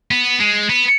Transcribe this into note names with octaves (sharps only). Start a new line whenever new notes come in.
B3
G#3
B3